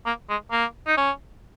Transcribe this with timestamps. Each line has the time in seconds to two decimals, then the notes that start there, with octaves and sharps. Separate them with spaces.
0.06 A#3
0.30 G#3
0.52 A#3
0.87 D#4
0.97 C#4